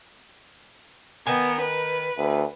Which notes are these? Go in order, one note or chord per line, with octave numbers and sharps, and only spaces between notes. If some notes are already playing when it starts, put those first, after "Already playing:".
D#3 B3 A#4 G#5
B4
D2